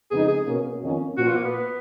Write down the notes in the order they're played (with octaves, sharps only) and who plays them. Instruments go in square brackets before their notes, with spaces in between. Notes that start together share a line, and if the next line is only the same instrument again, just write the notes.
[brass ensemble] F2 C#3 G#3 B3 D#4 [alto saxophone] G#4
[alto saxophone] G#4
[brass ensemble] B2 A#3 C#4
F2 D#3 A#3 C#4
[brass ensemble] A#2 F3 B3 [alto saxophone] F#4
[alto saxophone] F4
A#3
B3